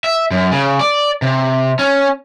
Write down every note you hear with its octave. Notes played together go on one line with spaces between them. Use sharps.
E5
F#2
C#3
D5
C3
C#4